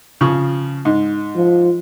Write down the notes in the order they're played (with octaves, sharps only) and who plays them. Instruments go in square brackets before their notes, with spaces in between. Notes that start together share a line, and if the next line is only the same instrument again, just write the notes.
[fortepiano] C#3 F3 C#6
G#2
[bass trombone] F3